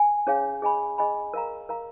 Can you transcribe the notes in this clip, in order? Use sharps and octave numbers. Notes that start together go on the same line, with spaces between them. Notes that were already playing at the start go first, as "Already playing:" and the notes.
Already playing: G#5
C#4 G#4 C#5 F5 G#5
G#4 D#5 G#5 B5
G#4 D#5 G#5 B5
A#4 F5 A#5
A#4 F5 A#5